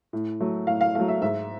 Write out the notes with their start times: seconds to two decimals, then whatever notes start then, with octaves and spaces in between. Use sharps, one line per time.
0.13 A2
0.41 F#3 A3
0.67 A2 F5
0.81 F5
0.95 A3 F5
1.00 F#3
1.08 E5
1.22 G#2 E5